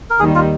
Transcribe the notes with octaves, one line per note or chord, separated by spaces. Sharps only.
A#4
D#2 D#3 G3 G#4
F4